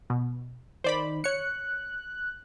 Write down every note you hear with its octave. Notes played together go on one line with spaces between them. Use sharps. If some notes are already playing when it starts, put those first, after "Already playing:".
B2
D#3 C5 D5 B5
C#5 F#6 C#7